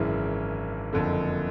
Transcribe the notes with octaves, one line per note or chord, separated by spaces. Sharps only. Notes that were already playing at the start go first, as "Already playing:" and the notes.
Already playing: G#1 F#2 C#3 E3
F#1 F2 D3